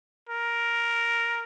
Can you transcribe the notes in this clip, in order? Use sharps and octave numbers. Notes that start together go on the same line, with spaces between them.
A#4